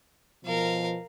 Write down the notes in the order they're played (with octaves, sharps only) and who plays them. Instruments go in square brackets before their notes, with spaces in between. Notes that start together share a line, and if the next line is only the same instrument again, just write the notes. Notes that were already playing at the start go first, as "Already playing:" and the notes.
[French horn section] B2 F3 [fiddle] A#4 F5